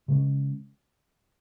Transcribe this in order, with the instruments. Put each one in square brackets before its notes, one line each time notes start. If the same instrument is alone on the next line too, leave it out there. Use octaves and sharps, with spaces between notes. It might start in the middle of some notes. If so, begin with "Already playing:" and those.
[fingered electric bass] C#3 G#3 C#4